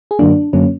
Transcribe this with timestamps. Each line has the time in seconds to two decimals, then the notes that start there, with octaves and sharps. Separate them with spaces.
0.11 G#4
0.19 F#2 D3 F#3 A#3 D4
0.53 F#2 D3 F#3 A#3 C#4